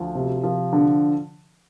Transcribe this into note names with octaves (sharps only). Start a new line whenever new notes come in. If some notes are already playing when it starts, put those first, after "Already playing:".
Already playing: D2 F3
C3
F3
D3